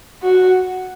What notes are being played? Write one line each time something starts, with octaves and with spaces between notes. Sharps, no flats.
F#4